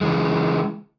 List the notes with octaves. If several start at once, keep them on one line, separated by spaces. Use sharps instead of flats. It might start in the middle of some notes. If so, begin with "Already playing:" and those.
C#3 E3 G#3